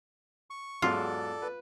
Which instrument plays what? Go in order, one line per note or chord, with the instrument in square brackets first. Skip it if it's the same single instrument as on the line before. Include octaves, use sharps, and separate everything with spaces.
[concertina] C#6
[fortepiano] E2 G#2 F#3 [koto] F4 [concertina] A4 D5
[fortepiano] B4